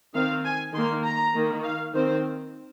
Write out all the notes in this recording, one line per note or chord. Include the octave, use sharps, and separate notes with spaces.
D#3 C4 F5
G#5
D#3 A#3 C6
A#5
D#3 A#3
F5
D#3 C4 C5